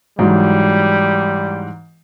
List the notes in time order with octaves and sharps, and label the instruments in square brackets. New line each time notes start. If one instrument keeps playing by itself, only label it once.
[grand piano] G#2 E3 F#3 [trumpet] G3